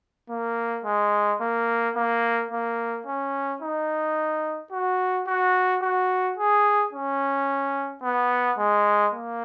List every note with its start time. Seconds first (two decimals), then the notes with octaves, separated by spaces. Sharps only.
0.30 A#3
0.85 G#3
1.41 A#3
1.96 A#3
2.51 A#3
3.07 C#4
3.62 D#4
4.72 F#4
5.27 F#4
5.82 F#4
6.38 G#4
6.93 C#4
8.03 B3
8.58 G#3
9.13 A#3